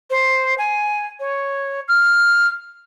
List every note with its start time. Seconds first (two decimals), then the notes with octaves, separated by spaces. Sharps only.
0.10 C5
0.58 G#5
1.20 C#5
1.88 F6